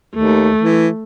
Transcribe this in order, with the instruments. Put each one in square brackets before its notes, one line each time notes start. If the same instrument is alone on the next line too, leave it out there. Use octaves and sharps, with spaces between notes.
[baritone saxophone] D#2 [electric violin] A3
[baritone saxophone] E3